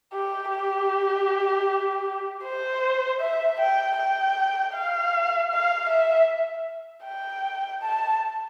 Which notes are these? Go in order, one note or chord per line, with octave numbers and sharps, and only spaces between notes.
G4
G4
C5
E5
G5
G5
F5
F5
E5
G5
A5